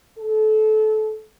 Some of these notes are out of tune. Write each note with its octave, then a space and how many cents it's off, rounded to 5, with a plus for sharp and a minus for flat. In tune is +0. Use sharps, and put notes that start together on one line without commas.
A4 -25